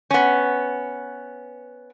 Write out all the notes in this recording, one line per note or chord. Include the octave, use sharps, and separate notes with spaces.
B3 C#4